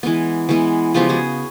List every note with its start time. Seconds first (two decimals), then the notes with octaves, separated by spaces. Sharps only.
0.03 E3 G#3 B3
0.49 E3 G#3 B3
0.94 C#3 F3 G#3 B3 F4 G4
1.09 F#4 G#4